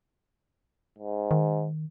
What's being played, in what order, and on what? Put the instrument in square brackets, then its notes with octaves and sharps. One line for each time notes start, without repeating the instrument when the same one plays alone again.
[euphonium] G#2
[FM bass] D#3